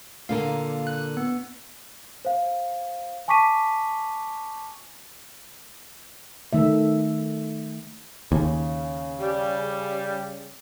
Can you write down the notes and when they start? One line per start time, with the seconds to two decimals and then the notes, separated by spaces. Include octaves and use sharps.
0.29 A#2 D3 A#3 F5
0.87 F#6
1.17 B3
2.25 C5 F5
3.28 G#5 A5 C#6 D6 B6 D#7
6.53 D#3 A3 E5
8.32 D#2 C#3
9.20 G3